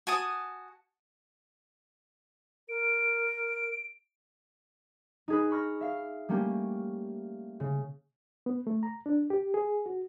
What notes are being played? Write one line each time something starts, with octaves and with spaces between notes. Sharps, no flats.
F#4 G#5 A5 D#6
A#4 D7
D#4 G#4 B4
B5 C#6 F6 A#6
E5 F5 C7
G3 A3 A#3 C#4 G4
C#3
B3
A3
A#5
D4
G4
G#4
F#4